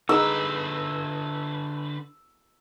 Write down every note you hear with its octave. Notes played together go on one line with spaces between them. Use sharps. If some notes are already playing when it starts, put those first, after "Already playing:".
D3 D#4 G#4 B4 D#5 E6